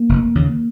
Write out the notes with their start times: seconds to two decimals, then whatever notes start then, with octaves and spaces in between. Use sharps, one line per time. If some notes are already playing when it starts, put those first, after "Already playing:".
Already playing: A#3
0.09 F1
0.35 D#2 C#3